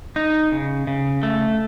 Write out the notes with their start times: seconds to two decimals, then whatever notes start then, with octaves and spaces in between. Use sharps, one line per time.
0.16 D#4
0.52 C#3
0.87 C#3
1.23 A3